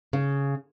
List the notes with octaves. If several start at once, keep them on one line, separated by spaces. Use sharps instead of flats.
C#3